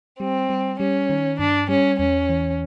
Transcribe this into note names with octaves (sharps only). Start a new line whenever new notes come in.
G3 C4
G3
G3 C#4
D#3
G2 D4
G3 C#4
E2 C#4
E3